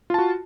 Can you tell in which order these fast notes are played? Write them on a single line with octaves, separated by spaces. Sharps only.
F4 A5 F#4